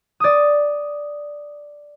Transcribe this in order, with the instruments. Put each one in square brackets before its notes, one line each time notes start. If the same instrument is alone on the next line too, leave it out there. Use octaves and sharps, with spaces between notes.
[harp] D5 D#6